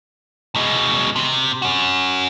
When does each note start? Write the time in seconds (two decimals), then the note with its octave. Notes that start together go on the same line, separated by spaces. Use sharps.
0.55 B2 G#3
1.16 C3
1.62 C#4 F#4